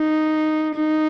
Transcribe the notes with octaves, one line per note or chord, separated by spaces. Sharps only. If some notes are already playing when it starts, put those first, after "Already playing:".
Already playing: D#4
D#4